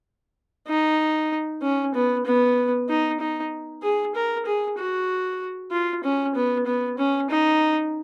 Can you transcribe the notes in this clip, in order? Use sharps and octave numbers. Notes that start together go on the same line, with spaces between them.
D#4
C#4
B3
B3
D#4
D#4
G#4
A#4
G#4
F#4
F4
C#4
B3
B3
C#4
D#4